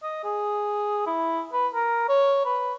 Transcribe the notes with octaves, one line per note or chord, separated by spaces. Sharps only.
D#5
G#4
E4
B4
A#4
C#5
B4